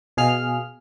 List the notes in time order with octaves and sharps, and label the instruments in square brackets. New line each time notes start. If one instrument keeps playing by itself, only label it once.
[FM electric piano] B2 G#4 F5 F6